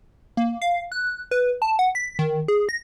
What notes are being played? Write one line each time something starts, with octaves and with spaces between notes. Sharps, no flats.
A#3
F5
F#6
B4
A5
F#5
B6
D#3
G#4
A#6